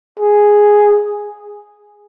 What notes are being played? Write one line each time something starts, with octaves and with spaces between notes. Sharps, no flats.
G#4